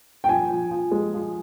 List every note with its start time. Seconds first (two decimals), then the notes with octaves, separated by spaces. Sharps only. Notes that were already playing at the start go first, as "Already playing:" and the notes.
0.24 G5
0.28 F3 G#5
0.50 F3
0.71 F3
0.92 G#3
1.14 F3